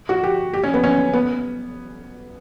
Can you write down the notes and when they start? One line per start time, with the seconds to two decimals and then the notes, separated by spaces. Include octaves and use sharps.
0.09 F#4
0.23 G4
0.53 G4
0.63 C#4
0.74 B3
0.83 C#4
1.13 B3